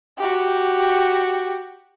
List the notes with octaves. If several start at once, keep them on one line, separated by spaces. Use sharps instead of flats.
F#4 G4